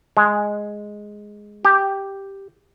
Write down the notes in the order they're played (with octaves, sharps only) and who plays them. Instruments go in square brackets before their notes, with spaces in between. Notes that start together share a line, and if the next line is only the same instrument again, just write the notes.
[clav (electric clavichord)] G#3
G4